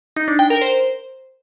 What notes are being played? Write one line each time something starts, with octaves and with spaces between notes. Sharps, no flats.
D#4
D4
G5
A#4
C5